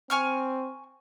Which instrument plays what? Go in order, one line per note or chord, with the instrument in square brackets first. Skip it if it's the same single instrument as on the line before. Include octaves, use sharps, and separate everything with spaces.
[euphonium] C4 [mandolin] G#5 C#6 F6